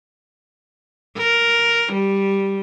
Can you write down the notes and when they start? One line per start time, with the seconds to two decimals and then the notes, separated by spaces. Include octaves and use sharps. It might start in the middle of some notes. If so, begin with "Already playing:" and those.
1.18 A#4
1.93 G3